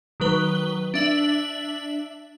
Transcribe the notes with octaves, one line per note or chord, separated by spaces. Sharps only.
D#3 F#3 B4 G7
D4 E5 F#7